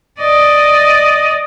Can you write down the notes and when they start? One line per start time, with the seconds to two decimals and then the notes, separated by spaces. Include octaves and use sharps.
0.20 D5 D#5